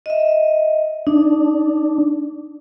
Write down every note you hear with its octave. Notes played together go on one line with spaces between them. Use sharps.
D#5 E5
D4 D#4